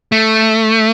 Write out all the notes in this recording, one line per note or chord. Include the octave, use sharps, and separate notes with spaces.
A3